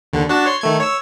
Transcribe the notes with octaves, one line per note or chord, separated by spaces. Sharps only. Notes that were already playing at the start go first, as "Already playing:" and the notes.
D#2 D3
D4 F#4 A5
C#5 C6
D#3 A3 G#6
C#5 E6